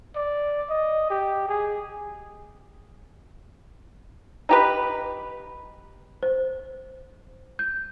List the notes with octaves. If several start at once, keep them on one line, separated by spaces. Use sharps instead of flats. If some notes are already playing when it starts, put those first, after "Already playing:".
D5
D#5
G4
G#4
D#4 G4 B4
C5
G6